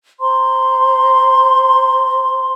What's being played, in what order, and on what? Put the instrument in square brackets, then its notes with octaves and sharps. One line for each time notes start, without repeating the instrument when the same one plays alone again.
[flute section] C5 A#5 C6